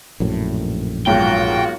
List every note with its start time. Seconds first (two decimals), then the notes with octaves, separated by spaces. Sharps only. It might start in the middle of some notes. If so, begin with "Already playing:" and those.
0.20 A#1 F#2 A2
1.07 B1 G#2 A#3 F4 F#4 G5